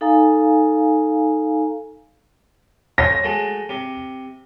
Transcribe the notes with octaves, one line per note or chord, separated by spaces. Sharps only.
D#4 A4 F5 G#5 A#5
C5 C#5 G#5 A#6
G#3 A3 F#4
C3